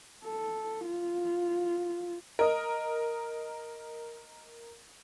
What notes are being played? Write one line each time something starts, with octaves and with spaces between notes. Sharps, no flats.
A4
F4
A#4 D#5